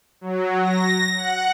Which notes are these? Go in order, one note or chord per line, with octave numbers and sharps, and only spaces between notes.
F#3
A#6
F#5